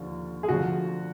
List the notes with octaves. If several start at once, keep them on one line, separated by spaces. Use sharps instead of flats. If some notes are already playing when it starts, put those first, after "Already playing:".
Already playing: D#2 D3 F3
G#4
D2 D3 F3 F#4